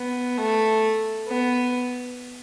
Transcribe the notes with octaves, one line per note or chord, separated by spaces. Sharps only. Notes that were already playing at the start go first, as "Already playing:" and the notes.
Already playing: B3
A3
B3